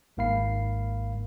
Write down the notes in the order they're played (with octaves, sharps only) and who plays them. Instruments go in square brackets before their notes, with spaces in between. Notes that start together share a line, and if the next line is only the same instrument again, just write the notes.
[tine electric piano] G#1 G#2 A#3 F5 B5 C7